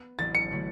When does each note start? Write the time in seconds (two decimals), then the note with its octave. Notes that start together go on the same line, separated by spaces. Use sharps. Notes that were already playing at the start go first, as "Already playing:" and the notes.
Already playing: B3
0.18 A1 A2 F#3 A6
0.35 C#7
0.51 D3 F#3 A3 E4